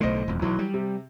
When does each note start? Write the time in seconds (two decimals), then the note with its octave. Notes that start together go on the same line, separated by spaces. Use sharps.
0.01 B1 A2 D3 C5 D#5
0.28 E1 F2
0.42 B1 E3 F#3
0.59 G3
0.74 C3